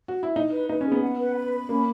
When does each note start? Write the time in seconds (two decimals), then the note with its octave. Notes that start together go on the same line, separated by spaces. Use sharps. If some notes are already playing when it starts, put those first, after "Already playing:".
0.08 F#4
0.23 E4
0.36 D#4 D#5
0.52 B4
0.69 D#4 B4
0.81 C#4
0.86 G#4
0.92 B3
1.02 F#5
1.19 B4
1.36 B5
1.52 B5
1.69 A#3 C#4